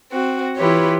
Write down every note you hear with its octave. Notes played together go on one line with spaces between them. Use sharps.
C4 F#4
E3 E4 F4 G4 B4 C#5